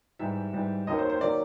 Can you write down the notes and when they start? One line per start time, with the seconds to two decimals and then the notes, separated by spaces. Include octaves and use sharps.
0.19 G#2 E3 G3 E5
0.53 G#2 E3 G3
0.87 D#2 D#3 F#3 A#3 C#4 D#5
0.99 C5
1.10 C5
1.21 D#3 F#3 A#3 C#4 D5